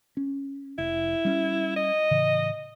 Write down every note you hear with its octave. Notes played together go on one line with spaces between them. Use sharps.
C#4
F1 E4
G3 C#4
D#5
A2 C#3 E3